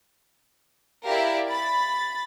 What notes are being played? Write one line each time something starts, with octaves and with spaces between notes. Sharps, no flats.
E4 G4 A#4 D5 E5 F5
B5 A6